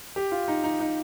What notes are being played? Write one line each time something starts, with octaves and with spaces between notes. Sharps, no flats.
G4
F4
D#4
D#4
D#4